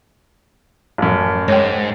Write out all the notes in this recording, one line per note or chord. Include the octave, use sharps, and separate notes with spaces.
A1 F#2
G#2 C#5 G5